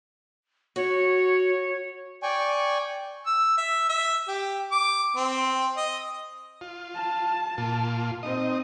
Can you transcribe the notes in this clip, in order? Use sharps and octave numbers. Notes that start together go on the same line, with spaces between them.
F#4 C#5
D5 G5 G#5 C#6
E6
E5
E5
G4
D6
C4
D#5
F4
A5
A#2 F4
C4 D#4 D#5